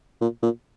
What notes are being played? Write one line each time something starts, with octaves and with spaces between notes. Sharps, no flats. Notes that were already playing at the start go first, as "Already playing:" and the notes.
A#2
A#2